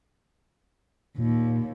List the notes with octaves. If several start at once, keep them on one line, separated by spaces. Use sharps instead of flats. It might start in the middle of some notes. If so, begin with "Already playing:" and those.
D#2 A#2